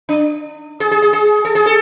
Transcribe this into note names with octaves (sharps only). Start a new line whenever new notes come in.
D4
G#4
G#4
G#4
G#4
A4
G#4
A4